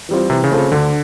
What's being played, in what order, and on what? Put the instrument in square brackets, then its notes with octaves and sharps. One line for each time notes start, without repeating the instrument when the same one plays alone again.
[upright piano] E3 G3 C4 F4
[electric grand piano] C3 [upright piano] E3
[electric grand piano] C#3
[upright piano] A3 C4 F4 A4
[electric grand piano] C#3
[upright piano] D2 [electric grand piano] D3